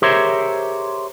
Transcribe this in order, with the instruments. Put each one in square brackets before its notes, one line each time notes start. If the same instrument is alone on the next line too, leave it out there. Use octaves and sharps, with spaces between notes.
[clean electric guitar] G4 G#4 A#4 C5 C#5 E5